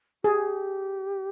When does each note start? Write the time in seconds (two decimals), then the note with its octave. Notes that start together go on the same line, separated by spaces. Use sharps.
0.24 G4 G#4